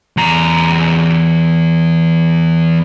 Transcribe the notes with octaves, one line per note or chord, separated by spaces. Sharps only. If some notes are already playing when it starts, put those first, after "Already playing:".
E2 A#5